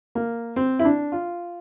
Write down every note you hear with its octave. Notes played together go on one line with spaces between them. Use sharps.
A#3
C4
E4
D4
F4